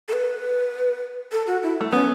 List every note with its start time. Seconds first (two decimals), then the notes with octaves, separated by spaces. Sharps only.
0.08 A4
0.13 B4
1.32 A4
1.47 F#4
1.63 E4
1.81 A3
1.92 B3 C#4